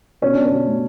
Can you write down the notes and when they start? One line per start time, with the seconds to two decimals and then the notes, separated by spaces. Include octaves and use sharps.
0.22 B2 C#4
0.33 B2 D4
0.46 C#4
0.51 B2
0.67 A3